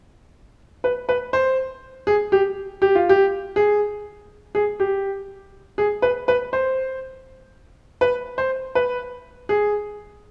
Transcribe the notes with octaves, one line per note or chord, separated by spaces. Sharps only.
B4
B4
C5
G#4
G4
G4
F4
G4
G#4
G#4
G4
G#4
B4
B4
C5
B4
C5
B4
G#4